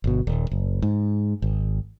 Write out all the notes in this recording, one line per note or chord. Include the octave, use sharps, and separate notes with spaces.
G1 B2
D#1
F#1
G#2
G#1